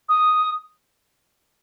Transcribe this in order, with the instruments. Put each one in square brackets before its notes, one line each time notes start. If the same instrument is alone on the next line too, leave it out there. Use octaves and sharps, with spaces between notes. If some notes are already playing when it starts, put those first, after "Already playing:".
[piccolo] D#6